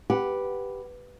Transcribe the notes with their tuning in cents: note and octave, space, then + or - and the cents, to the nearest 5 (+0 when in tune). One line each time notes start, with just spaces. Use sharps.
G4 +0 B4 +0 F#5 +0